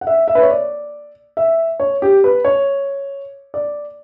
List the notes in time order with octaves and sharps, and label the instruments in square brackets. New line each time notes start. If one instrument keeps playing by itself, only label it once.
[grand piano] F#5
E5
E5
B4
C#5
D5
E5
C#5
G4
B4
C#5
D5